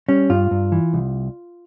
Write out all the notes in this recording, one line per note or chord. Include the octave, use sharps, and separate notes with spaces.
G3 C#4
G2 F4
G2
E3
C2